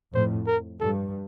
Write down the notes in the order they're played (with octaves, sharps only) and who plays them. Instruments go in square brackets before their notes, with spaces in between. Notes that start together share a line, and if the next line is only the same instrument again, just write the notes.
[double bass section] F2 A2 [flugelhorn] C5
[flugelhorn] A#4
[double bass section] G2 [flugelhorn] A4